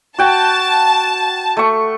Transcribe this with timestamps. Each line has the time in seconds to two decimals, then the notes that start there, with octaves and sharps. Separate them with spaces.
0.18 F#4 G5 A5
1.57 A3 C#6